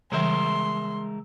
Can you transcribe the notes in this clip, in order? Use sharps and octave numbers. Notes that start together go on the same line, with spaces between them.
C#3 E3 G3 G#3 A#4 E5 C6